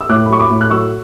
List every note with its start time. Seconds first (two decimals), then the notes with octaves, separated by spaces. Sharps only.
0.01 E6
0.09 A2 D6 F#6
0.26 B5
0.29 F#3 C#6
0.39 B5 D6
0.50 A2
0.61 F#6
0.70 F#3 C#6 E6